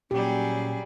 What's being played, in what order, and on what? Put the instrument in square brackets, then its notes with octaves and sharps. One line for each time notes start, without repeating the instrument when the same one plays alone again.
[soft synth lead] A#2 [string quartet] F#3 G3 G#4 [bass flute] C#4 [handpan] G4